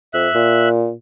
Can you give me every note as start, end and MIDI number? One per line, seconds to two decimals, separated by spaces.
0.14 0.28 41
0.14 0.69 76
0.14 0.69 90
0.35 0.92 46